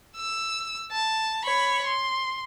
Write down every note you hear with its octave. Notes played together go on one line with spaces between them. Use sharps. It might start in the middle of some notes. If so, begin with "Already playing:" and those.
E6
A5
C#5 B5
C6